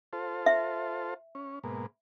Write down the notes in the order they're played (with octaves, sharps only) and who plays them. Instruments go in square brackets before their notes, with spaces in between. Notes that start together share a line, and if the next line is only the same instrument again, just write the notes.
[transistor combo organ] F4 A4 C5
[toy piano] E5
[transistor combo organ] C#4
G#2 B2 A#3